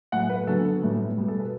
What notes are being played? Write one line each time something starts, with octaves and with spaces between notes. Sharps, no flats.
A2 F#3 A3 F#5
B4
D3 F#3 B3 A4
A2 G3 B3
B2 G3 B3
A4
B4